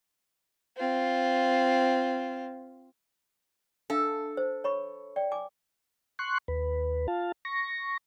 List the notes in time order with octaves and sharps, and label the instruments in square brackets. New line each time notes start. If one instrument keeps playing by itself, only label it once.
[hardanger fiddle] C4 F4
[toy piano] D4 E5 F5 [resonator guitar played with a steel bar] A4
[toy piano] C5
C#5 B5 C#6
D5 G5
G#5 D6
[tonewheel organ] C6 C#6 F#6
D#2 B4
F4 F5 A5
C#6 A#6